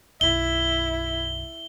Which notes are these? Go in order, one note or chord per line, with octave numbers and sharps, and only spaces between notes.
B1 F#2 E4 G7